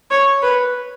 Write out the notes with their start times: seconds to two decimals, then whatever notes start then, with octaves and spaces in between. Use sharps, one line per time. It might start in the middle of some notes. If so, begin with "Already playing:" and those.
0.11 C#5
0.42 B4